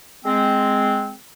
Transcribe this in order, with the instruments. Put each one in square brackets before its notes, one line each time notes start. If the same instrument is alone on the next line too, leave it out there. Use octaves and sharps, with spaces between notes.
[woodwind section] G#3 C4